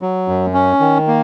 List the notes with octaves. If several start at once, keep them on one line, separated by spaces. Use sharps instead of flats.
F#3
F#2
C#4
D#3
A#3